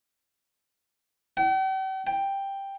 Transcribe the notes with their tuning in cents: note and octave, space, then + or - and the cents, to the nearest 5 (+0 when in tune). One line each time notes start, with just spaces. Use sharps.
G5 -45
G5 +5